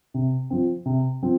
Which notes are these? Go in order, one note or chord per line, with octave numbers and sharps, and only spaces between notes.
C3
F3 C4
C3
F3 C4